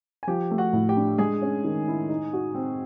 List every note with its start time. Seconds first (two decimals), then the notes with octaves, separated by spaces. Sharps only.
0.23 G#5
0.27 F3 G4 G5
0.51 A3
0.58 F#4 F#5
0.73 A2
0.89 G4 G5
0.96 D4
1.18 G#3 G#4 G#5
1.42 C#4
1.64 D#3
1.88 E4
2.09 D#4
2.33 F#4
2.55 C4